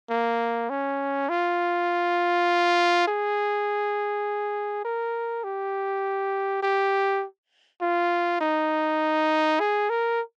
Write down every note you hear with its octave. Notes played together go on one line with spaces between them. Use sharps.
A#3
C#4
F4
G#4
A#4
G4
G4
F4
D#4
G#4
A#4